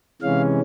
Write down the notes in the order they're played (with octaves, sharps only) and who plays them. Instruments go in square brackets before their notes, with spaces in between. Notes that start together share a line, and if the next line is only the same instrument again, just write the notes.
[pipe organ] C3 E3 G#3 C#4 F5